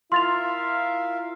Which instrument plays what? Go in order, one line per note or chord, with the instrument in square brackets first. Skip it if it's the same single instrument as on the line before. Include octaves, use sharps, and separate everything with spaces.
[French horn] E4 [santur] F4 [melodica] A#4 E5 F5 [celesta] C6 A6 F7